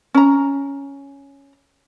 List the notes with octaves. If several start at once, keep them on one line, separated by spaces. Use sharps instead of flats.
C#4 A#5